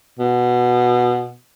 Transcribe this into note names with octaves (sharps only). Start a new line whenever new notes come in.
B2